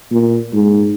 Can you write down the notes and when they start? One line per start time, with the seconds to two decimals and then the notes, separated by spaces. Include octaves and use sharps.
0.11 A#2
0.53 G#2